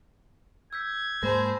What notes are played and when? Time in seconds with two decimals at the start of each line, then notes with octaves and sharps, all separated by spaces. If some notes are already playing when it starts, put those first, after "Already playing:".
0.73 E6 G6 G#6 B6
1.23 G#2 G#3 A#3 G#4 C5 A5 B5 A#6